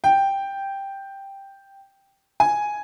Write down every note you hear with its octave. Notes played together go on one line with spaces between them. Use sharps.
G5
G#5